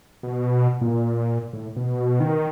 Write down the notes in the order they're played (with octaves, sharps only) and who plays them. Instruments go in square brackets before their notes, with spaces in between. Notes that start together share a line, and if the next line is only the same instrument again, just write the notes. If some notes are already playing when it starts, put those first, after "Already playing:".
[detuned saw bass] B2
A#2
A2
B2
D#3